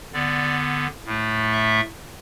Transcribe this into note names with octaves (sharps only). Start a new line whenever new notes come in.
D3 B3 D5
A2 A3
E5